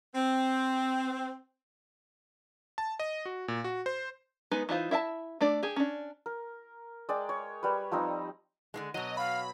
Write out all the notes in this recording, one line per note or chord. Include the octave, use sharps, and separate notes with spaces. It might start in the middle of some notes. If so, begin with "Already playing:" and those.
C4
A5
D#5
F#4
A#2
F#4
C5
G#3 B3 D#4 B4 G#5
E3 D#4 F4 C5
E4 E5 F5 A5
A3 D4 D5
G4 G#4
C#4 D4
A#4
G#3 D5 G5
C#5
G3 B4
F3 G3 C4 D#4
D3 E3 G#3
B2 F#3 D#5
F5 B5